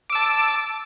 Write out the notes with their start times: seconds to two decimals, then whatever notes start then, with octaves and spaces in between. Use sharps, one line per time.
0.10 D6
0.12 E6
0.15 A5